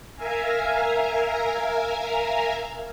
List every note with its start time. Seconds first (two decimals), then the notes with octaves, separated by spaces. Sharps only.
0.15 A#4 E5 F5 G#5 A#5